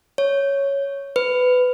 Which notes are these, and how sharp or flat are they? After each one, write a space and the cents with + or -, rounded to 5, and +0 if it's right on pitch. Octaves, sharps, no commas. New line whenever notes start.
C#5 +0
B4 +20